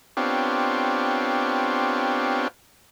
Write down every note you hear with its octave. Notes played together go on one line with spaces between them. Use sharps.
B3 C4 D4 F4 G4 C#5